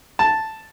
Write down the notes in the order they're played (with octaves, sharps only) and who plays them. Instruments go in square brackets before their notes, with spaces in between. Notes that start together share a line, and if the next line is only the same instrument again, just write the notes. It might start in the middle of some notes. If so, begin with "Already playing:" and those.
[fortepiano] A5